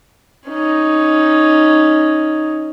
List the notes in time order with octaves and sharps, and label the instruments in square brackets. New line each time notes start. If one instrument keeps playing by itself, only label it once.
[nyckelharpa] C#4 D#4